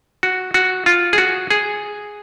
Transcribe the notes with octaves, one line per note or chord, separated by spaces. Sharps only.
F#4
F#4
F4
G#4
F#4
G#4